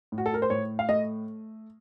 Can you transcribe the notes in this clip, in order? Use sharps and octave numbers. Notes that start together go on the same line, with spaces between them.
A2
F#4
A4
A#4
C5
A2 C#5
F5
A3 D#5